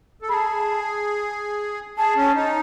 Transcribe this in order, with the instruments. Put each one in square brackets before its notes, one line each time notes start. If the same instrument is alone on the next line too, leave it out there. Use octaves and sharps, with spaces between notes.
[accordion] A4
[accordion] G#4 [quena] A5 B5
[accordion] G#4 [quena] A5
[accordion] C#4
D#4